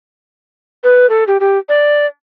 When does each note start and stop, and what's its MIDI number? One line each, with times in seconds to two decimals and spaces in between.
0.84 1.09 71
1.09 1.24 69
1.27 1.37 67
1.40 1.58 67
1.69 2.06 74